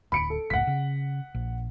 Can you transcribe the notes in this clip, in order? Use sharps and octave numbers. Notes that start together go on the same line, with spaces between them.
D1 B5 C#7 D7
A4
F#1 C#2 A2 F#5 B6
C#3
A#1